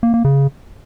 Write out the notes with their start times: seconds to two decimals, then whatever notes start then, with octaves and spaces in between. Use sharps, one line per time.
0.03 A#3
0.14 A#3
0.25 C#3